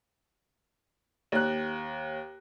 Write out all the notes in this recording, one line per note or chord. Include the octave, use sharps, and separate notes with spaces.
D#2 F#6